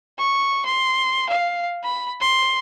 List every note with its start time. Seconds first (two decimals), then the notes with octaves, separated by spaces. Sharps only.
0.19 C#6
0.66 C6
1.29 F5
1.84 B5
2.21 C6